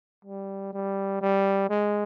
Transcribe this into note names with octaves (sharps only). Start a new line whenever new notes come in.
G3
G3
G3
G#3